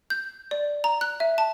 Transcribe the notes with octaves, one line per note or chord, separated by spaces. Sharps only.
G6
D5
A#5
F#6
E5
A5